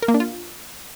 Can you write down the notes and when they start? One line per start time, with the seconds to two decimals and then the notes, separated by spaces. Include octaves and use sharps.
0.02 A#4
0.08 A#3
0.14 D4
0.20 F4